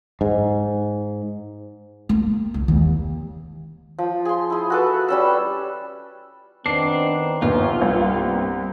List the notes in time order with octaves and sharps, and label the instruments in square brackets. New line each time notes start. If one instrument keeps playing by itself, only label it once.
[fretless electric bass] G#2
[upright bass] A#3
C#2
D#2
[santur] F3
G#4 C6
E4 G#4
F#4 A4 B4
G3 C#4 E6
[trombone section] D#3 B3 C4 [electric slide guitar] D4 [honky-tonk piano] C7
[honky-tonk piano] A#1 D#2 [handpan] B3 [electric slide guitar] F4
[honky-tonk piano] C2 [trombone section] G2 A#3 C4